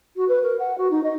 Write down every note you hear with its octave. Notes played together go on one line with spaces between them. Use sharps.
F#4
B4
A#4
F#5
F#4
D#4
D#5